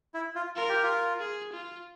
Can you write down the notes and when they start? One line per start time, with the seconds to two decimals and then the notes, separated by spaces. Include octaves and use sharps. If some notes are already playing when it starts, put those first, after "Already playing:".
0.14 E4
0.35 F4
0.56 F4 A#4
0.69 G4
0.83 F4
1.20 G#4
1.52 F4